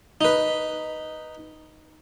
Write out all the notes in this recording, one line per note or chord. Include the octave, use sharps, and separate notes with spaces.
D#4 B4